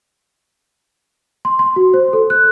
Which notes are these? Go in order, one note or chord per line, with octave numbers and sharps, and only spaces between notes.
C6
C6
F#4
C5
A4
F#6